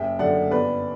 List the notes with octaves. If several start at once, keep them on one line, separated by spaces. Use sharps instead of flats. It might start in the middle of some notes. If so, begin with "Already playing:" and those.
Already playing: F#1 E5 G5
F#2 D3 D5 F#5
G1 B4 D5